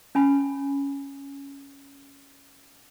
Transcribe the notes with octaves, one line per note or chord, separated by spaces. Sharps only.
C#4 G#5 B5